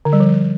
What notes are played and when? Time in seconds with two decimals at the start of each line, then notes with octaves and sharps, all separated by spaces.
0.05 D3
0.13 G3
0.20 F3